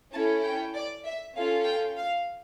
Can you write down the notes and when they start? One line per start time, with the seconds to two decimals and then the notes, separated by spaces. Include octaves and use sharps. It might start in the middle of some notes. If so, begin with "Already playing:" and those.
0.12 C#4 E4 A4 A5
0.43 G5
0.74 D5
1.04 E5
1.35 C#4 F4 A4 F5
1.65 G5
1.97 F5